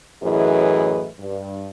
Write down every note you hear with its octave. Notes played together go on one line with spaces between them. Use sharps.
F#2 A2 E3 G#4 B4 D#5
G2